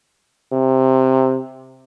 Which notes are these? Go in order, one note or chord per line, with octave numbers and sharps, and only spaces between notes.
C3